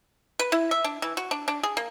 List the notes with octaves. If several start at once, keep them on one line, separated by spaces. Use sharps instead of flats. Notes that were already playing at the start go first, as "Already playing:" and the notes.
B4
E4
E5
D4
E3
F#4
D4
D4
G#4
A#3